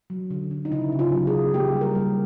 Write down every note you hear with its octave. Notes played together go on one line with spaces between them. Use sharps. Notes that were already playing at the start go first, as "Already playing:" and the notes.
F#3
D3
D3
D#4
C#3 E4
C#3
F4
F#3
G#4
C#3
A#3 G4
G3
A#4
G3